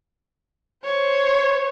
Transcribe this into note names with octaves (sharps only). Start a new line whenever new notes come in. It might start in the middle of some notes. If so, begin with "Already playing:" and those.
C5 C#5